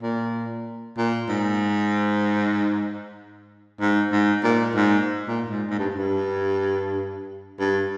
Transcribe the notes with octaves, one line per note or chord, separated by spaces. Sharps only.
A#2
A#2
G#2
G#2
G#2
A#2
G#2
A#2
G#2
G#2
G2
G2
G2